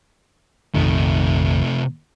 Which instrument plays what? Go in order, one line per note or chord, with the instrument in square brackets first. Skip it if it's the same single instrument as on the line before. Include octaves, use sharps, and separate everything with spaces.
[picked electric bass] A#1 F2 D#3 [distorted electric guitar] C3 A3